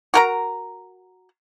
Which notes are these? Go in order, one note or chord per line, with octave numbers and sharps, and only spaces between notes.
F#4 A#4 A#5